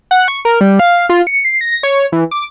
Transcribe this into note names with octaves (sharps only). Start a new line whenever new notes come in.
F#5
C#6
A#4
G3
F5
F4
C#7
C7
A#6
C#5
E3
D6